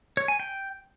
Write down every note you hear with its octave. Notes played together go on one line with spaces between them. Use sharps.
C#5
G#5
G5